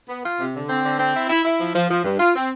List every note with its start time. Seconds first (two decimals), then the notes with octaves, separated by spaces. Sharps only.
0.09 B3
0.24 F4
0.39 C3
0.55 D3
0.69 C4
0.84 D3
0.99 C4
1.15 E4
1.29 E4
1.45 E4
1.59 F3
1.74 F3
1.90 F3
2.04 G2
2.19 F4
2.35 C4